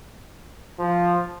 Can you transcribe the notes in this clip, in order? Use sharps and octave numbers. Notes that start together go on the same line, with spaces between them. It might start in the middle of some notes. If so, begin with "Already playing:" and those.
F3